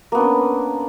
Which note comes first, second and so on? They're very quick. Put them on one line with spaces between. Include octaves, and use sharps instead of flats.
A#3 B3 D4 C#4